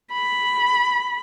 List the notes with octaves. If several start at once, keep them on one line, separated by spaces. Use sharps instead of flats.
B5